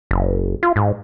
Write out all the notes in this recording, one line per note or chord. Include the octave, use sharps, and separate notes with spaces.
F#1
F4
G#2